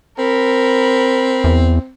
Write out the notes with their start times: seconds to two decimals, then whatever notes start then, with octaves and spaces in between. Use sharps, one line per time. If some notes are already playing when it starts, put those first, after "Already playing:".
0.18 C4 A#4 B5
1.44 E2